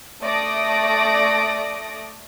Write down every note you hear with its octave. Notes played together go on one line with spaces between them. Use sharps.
A3 A4 D5 D#6 A#6 D7